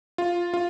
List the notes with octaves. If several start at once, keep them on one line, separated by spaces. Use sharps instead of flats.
F4
F4